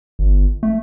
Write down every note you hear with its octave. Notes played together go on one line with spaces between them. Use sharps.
G1
A3